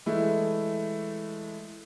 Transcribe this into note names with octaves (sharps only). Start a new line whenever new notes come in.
E3 G#3 A3 E4